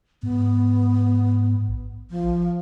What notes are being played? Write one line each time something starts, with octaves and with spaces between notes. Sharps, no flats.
G#2 B3
A1
F3